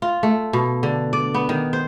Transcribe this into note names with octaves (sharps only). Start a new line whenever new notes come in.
F4
A3
B2
D3
D5
B3
D#3
C5